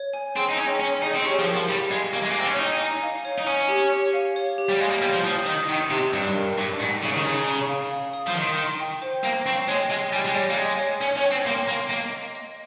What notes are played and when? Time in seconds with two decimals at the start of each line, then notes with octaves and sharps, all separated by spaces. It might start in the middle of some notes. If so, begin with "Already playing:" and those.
Already playing: C#5
0.13 G#5
0.36 C4 G#4
0.50 D#4
0.58 C#4 G5
0.80 C#4 C#6
1.03 D#4 G#4
1.15 C4
1.24 C#4 G4
1.40 F3
1.47 A#4
1.54 F3
1.69 G3 G4
1.91 G#3 F5
2.13 A#3 C#6
2.23 G#3
2.31 A#3
2.36 C4 G#5
2.47 C#4
2.58 D#4 C#6
2.80 G#5
3.03 F5
3.25 C#5
3.38 D#4
3.46 C#4 C#5
3.68 G4
3.92 G4
4.13 F5
4.36 C#5
4.58 G4
4.69 G3
4.80 G#3 F5
4.91 A#3
5.02 G3 G6
5.13 F3
5.24 F3 D#6
5.46 D#3 D#6
5.68 D#3 D#5
5.91 C3 G4
6.13 G2 D#5
6.35 A#4
6.58 G2 C#6
6.80 G#2 C#6
7.02 C#3 G#4
7.14 D#3
7.24 C#3 A#5
7.46 D#6
7.69 F5
7.91 F5
8.13 D#6
8.27 F3
8.35 D#3 C6
8.58 C6
8.80 G5
9.02 C5
9.24 A#3 G5
9.46 C4 C#6
9.68 G#3 C#5
9.90 G#3 G5
10.13 G3 G#5
10.26 G#3
10.35 G3 C#5
10.51 A#3
10.57 G#3 G#5
10.79 C#5
11.01 C#4 C#5
11.17 C#4
11.24 G5
11.31 C4
11.45 A#3 C6
11.68 A#3 C6
11.90 A#3 D#5
12.12 D#5
12.35 D#5